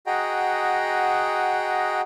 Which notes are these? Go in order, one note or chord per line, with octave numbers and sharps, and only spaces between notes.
F#4 G#4 D#5 F#5 G5 A#5